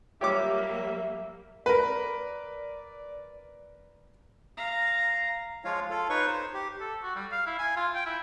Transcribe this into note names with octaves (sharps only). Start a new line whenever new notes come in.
F#3 G3 A#3 G4 C#5 E5 D6
A#4 B4 D5
F5 A#5
F3 G#3 F4 C#5 F5
F4 A4 F5
D#4 B4 C#5 C#6
C5
G4
A4
F#4
G3
F5
E4
G#5
F4
G5
E4